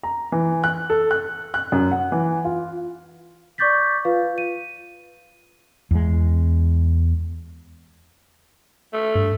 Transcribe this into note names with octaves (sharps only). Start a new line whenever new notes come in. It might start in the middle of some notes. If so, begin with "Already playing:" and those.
A#5
E3
F#6
A4
F#6
F#6
F#2
F#5
E3
F4
D5 C#6 D6 G6 A6 B6
F4 B4 F5
D#7
E2 G#3
A3
G2